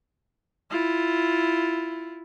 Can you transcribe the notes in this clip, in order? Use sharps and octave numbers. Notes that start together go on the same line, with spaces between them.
E4 F4